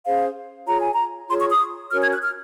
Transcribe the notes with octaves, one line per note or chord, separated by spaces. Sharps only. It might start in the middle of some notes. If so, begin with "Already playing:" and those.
C#4 G#4 C5 F5
F4 G#4 C#5 A#5
G#5
A#5
F4 G#4 C#5 C6
C#6
D#6
C#4 F#4 A#4 C#5 F6
G#6
F#6
F6